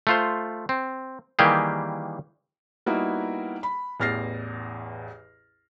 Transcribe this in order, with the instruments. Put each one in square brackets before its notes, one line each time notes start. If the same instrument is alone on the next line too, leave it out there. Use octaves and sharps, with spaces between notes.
[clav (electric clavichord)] A3 F4 C5
C4
D#3 E3 G3 A#3 G4 G#4
[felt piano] G3 A#3 B3 D#4 E4 F#4
B5
A1 E2 F6 A6 A#6 C7